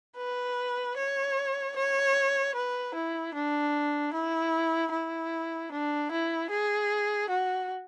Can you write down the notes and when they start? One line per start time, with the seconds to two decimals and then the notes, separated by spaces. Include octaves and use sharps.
0.17 B4
0.97 C#5
1.76 C#5
2.55 B4
2.95 E4
3.34 D4
4.13 E4
4.92 E4
5.72 D4
6.11 E4
6.50 G#4
7.29 F#4